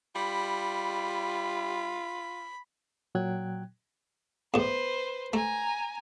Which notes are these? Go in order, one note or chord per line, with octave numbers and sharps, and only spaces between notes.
G3 F4 B5
A#2 F#3 G5 F#6 G#6
E2 A2 B4 C5
A3 G#5 A#5